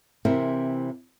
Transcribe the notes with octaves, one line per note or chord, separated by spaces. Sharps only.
C3 E3 C4 E4 A#4